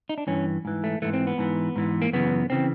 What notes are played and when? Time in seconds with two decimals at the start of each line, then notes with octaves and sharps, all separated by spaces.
0.09 D#4
0.18 D4
0.27 G2 E3 C#4
0.65 G#2 E3
0.84 A3
1.02 G#2 E3 A3
1.13 C4
1.27 B3
1.38 G#2 E3
1.76 G#2 E3
2.02 A#3
2.13 F#2 C#3 E3 B3
2.50 C#3 E3 C4